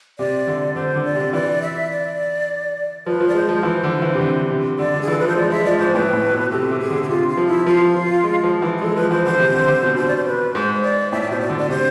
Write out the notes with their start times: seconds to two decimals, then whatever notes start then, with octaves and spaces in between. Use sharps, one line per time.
0.19 C3 D5
0.47 D3
0.76 D3 C5
0.96 D3
1.05 D5
1.15 C3
1.33 E3 D5
1.62 E5
1.91 D5
3.06 F3 B4
3.21 F3
3.28 D5
3.34 G#3 C5
3.49 F3
3.63 E3
3.84 D3
4.02 E3
4.14 C3
4.21 D3
4.50 C3
4.79 D3 D5
4.94 D3
5.01 G#4
5.08 E3 A4
5.19 F3 B4
5.28 C5
5.36 G#3 D5
5.50 G#3 E5
5.65 F3 D5
5.79 G#2 C5
5.94 A2 B4
6.13 A2
6.33 B2
6.51 C3 A4
6.71 C3
6.80 G#4
6.90 D3
7.03 G#4
7.09 C3 F4
7.28 F4
7.37 F3
7.47 E4
7.67 F3 F4
7.96 F3
8.24 G#3
8.44 F3
8.62 E3
8.78 G#4
8.81 G#3 A4
8.96 F3 B4
9.10 E3 C5
9.25 D3 C5
9.40 C3
9.54 D3
9.68 D3
9.83 B2
9.96 B2 C5
10.08 D5
10.17 C5
10.26 B4
10.54 G#2 C5
10.83 D5
11.12 A2 E5
11.21 D5
11.31 B2 C5
11.40 D5
11.50 D3
11.58 D5
11.69 C3 C5